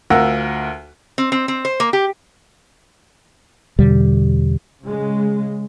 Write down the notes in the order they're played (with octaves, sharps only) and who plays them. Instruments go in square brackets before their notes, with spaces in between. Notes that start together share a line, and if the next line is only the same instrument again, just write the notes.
[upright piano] D2 F4 A#4 F#5 E6
[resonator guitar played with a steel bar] C4
C4
C4
C5
A#3
G4
[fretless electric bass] E2 B2 D3 G3
[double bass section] C#3 G#3